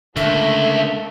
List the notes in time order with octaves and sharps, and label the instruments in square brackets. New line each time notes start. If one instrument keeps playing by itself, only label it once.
[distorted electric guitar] C#2 [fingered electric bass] D3 [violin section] A3 A#3 [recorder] E5